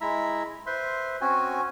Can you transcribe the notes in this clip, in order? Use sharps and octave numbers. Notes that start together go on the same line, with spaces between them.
G#3 E4 E5 A#5 E6
B4 C5 E5 C6
C4 C#4 F#4 G#5